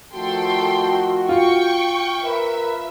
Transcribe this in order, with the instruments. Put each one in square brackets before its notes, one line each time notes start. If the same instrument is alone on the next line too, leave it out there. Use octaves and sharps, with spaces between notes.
[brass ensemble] D#3 F3 A3 [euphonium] F#4 [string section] A4 G5 C6
[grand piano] F4 [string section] G5 C#6
[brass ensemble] A#4 B4 [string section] E5